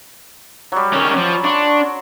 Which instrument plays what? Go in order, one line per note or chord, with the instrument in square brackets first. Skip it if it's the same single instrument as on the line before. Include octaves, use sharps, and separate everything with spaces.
[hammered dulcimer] F#3 G3
[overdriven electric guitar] D#3 C#4
F3
[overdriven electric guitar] D4 [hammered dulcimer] F#4 C6 C#6